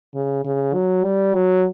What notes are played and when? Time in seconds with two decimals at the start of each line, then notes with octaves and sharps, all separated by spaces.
0.15 C#3
0.45 C#3
0.74 F#3
1.04 G3
1.34 F#3